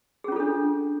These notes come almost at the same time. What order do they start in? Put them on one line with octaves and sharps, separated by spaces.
G#4 C#4 F4 A4 D4